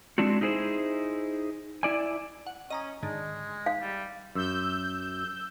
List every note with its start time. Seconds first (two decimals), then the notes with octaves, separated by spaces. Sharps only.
0.18 G#3 C4 D4 E4 F#4
0.41 D#4 E4 G#4 A#4 C5
1.83 E4 D5 G#5
2.47 F#5
2.70 C#4 D#5 A#5 D#6
3.03 G#2 D3 D#3 G#3
3.66 F5
3.81 G3
4.35 F#2 E6 G6